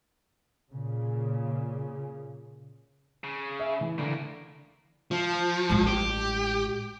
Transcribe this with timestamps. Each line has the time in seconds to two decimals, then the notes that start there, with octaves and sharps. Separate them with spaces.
0.72 A#2 C#3
3.24 C#3
3.60 E5
3.81 E3
3.98 A2 D3 E3 A#3
5.11 F3
5.70 A1 G#3
5.87 G4